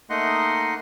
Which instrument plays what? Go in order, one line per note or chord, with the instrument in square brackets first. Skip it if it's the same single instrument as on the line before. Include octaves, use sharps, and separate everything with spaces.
[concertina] A3 A#3 D#4 D#5 F#5 C6